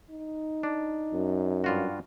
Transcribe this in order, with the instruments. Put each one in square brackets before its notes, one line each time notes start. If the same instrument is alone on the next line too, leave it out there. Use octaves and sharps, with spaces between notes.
[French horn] D#4
[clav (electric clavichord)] D4
[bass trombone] F#2
[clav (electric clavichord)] G2 F4 F#4